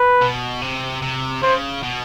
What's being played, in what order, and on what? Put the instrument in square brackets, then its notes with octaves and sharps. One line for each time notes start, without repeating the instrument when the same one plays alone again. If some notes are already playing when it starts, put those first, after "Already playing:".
Already playing: [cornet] B4
[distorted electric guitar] B2
C3
C3
[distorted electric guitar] C#3 [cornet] C5
[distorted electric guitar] B2